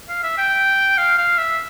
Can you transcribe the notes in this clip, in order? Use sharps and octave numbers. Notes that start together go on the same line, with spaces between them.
F5
E5
G5
F5
F5
E5